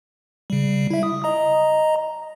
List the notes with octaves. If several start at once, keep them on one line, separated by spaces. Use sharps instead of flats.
C#3 G3
E4 E5
D#6
D#5 A#5